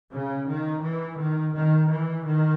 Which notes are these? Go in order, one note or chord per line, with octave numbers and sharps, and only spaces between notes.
C#3
D#3
E3
D#3
D#3
E3
D#3